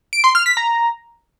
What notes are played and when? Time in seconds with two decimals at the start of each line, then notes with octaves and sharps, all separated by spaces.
0.13 D7
0.24 C6
0.35 F6
0.46 B6
0.57 A#5